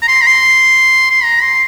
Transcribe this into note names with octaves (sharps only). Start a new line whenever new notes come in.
A#5
C6
A#5
C6
C6
A#5
C6